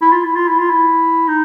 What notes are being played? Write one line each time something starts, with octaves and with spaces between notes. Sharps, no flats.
E4
F4
E4
F4
E4
F4
E4
D#4